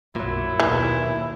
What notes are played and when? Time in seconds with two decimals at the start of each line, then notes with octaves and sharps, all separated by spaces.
0.16 B1 F#2 A#2 F#3 E4
0.60 D#2 B2 E3